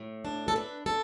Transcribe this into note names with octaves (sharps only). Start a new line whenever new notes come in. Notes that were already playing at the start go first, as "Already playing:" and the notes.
Already playing: A2
D4
A4
D4 B4
D4 A4